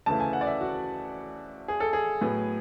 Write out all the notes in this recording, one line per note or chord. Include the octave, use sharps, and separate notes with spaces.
D2 C#3 E3 A3 A5
G#5
F#5
D5
E5
F#4
G#4
A4
G#4
A2 F#3 B3